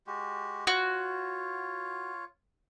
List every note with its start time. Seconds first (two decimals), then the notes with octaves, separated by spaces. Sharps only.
0.07 G#3 F#4 G4
0.67 F4 F#4 C#5